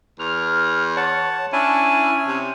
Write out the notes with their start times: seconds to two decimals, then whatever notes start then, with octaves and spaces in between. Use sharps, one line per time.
0.19 E2 F6
0.97 C#5 F#5 A5
1.53 C#4 D4 E4 G#5
2.27 C3